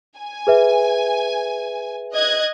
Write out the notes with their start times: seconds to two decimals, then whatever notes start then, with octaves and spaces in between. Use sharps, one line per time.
0.18 G#5
0.47 G#4 B4 E5
2.14 D#5 F#6 G#6